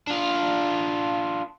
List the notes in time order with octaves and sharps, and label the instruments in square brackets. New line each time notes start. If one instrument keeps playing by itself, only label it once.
[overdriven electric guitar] D4 F4